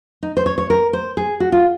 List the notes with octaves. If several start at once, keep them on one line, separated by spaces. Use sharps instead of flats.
D#4
C5
C#5
C#5
A#4
C5
G#4
F#4
F4